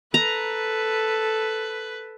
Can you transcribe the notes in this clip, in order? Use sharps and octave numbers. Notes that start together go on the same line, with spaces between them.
A4 B4 A#5